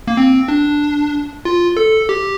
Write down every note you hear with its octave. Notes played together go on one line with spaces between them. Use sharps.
A#3
C4
D4
F4
A4
G4